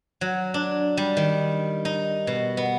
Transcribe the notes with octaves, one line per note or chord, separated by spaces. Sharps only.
F#3
D4
G3
D#3
D#4
B2
B3